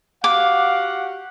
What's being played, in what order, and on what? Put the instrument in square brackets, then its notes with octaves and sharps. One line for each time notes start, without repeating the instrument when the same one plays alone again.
[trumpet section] F#4 G4 F#5 [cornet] F5 [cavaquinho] D6